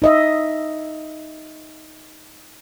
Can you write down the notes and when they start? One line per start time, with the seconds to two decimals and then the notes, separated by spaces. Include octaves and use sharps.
0.02 D#4 D#5 E5